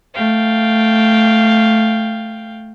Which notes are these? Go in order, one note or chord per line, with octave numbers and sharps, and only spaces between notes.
A3 F5 G5